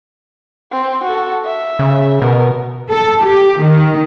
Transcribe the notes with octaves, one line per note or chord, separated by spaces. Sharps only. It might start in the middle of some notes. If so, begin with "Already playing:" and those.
C4
F#4 A4
E5
C#3
B2 B3 A#4
A4
G4
D#3